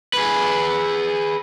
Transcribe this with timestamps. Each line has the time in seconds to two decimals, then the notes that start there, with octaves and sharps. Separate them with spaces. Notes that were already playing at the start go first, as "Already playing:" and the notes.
0.13 G#4 B4